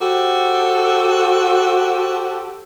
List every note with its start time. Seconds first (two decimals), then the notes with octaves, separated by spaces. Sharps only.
0.01 F#4 G4 A4 C5